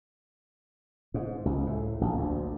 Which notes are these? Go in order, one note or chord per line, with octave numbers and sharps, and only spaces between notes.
G#2
C#2
A2
A#1
D2